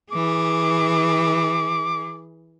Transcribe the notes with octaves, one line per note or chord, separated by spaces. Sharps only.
E3 G#4 D6